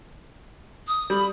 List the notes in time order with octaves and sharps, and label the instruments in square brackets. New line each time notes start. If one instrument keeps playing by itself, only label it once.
[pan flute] D#6
[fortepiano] G3 [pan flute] B5